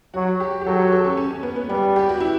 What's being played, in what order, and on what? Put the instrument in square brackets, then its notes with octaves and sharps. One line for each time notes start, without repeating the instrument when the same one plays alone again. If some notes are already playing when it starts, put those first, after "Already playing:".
[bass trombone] F#3 [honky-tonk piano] F#4
[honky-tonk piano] G4
G4
[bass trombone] F#3 [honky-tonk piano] A4
[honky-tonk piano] G4
A4
C#4
C#4
C#4
B3
B3
[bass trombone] G3 [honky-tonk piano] B3
[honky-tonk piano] G4
F#4
E4